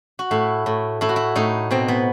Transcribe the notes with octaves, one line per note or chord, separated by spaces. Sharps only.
F#4
A2 E4
A2
A2 E4
F#4
E4
A2 D#4
B2 C4
B3